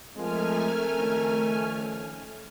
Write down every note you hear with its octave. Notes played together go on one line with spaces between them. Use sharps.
F3 G#3 A3 C4 A#4 G#5 F6
D#3 F3 C#4